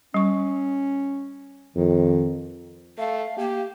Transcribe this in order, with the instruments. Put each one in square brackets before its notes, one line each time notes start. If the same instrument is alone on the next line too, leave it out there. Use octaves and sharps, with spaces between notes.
[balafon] G3 C#6 [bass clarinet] C#4
[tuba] F2 [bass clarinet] D#3
[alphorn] A3 [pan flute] F5
[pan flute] A#3 [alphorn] G4